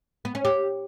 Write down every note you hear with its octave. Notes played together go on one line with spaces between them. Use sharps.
B3
C#4
G4